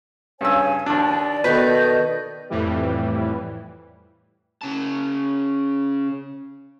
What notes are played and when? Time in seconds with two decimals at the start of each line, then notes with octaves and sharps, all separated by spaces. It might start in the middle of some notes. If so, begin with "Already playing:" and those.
0.41 G2 C#3 C#5 G#5 E6
0.86 D#2 D4 D5
1.44 B2 D#3 A4 B4 D5 D#5 G6
2.49 F2 A2 E3 G3
4.61 C#3 A5